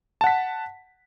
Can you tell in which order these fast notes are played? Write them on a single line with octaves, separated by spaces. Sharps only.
A5 F#5 B6